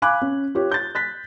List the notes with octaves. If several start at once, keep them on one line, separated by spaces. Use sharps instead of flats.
F5 G#5 B5 D6 F#6
C#4
F4 G4 C#5
G6 A6
F#6 A6 B6